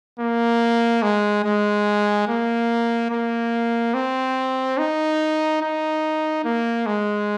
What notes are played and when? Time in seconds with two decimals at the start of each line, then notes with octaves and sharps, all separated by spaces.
0.20 A#3
1.02 G#3
1.44 G#3
2.28 A#3
3.11 A#3
3.94 C4
4.78 D#4
5.61 D#4
6.45 A#3
6.86 G#3